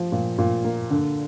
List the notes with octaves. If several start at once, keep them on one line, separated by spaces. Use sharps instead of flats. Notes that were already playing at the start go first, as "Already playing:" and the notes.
Already playing: F3
A#2
A#2
A#3
D3